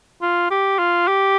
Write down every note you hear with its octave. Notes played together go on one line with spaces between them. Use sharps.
F4
G4
F4
G4